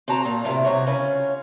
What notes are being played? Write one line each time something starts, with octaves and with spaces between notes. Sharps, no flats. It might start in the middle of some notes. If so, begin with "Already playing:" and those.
C4 F#4 A5 A#5
A#2
A2 C3 G3
C3 F#4 C#5
C#3 C#4 F4